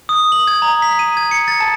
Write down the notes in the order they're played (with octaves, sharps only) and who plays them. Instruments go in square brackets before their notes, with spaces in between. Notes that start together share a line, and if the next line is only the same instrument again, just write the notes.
[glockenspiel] D#6
F#7
G#6
A#5
B6
D#7
G#6
C#7
A6
A5